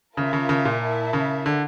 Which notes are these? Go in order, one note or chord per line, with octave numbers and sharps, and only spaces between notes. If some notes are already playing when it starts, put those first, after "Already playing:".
C#3 F4 A#4 E5 A5
C#3
C#3
A#2
E4 A#4 E5 A5
C#3
D3